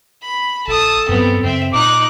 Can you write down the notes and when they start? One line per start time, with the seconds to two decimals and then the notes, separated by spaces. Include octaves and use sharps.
0.22 B5
0.67 A#1 A4 A5 D#6
1.09 G2 F#3 B3 C4
1.43 F#2 C#3 C4 E5
1.73 A#2 D#4 D6 F#6